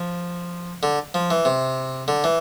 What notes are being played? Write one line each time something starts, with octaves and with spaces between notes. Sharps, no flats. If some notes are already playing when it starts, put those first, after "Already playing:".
Already playing: F3
D3
F3
E3
C3
D3
E3